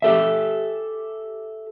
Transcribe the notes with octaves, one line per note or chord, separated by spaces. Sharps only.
G4 A4 E5